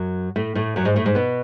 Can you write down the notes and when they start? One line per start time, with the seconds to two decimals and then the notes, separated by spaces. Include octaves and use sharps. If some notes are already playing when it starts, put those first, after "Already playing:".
Already playing: F#2 F#3
0.36 A2 A3
0.55 A2 A3
0.76 F#2 F#3
0.85 G#2 G#3
0.96 A2 A3
1.06 G#2 G#3
1.15 B2 B3